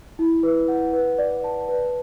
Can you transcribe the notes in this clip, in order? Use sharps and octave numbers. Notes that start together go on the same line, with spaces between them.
E4
B4
F#5
B4
D5
A5
B4